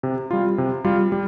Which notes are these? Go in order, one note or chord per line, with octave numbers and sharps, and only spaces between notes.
C3
G3 F4
C3
G3 F4
G3